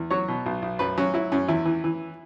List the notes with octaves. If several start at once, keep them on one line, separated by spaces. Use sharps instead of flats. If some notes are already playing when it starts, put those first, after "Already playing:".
Already playing: E2
F#3 C#5
B2
B1
B1
F#2 B4
F#3 C#4
F#3 E4
F#2 C#4
E2 E4
E3
E3